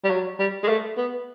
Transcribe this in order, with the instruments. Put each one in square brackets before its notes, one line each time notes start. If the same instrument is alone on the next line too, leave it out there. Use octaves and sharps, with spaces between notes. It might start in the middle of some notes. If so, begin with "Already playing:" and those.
[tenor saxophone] G3
F#3
G3
G#3
A3
B3